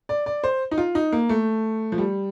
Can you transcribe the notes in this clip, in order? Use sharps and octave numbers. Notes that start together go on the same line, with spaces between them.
D5
D5
C5
D#4
F4
D#4
A#3
A3
F3
G3